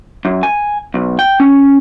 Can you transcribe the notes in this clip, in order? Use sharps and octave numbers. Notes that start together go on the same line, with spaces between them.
F#2
G#5
B1
G5
C#4